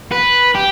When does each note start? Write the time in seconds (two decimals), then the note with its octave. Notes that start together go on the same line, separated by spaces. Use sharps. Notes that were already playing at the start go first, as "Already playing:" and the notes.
0.11 B4
0.55 G4